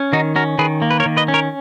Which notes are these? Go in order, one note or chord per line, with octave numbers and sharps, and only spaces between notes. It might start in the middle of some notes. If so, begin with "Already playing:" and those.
Already playing: C#4
D#3 D#4 F#4
C#4 F#4 A#4
D#3 G#4 B4
A#3
B4
A#4 C#5
D#3
B4 D#5
C#4
A#4 C#5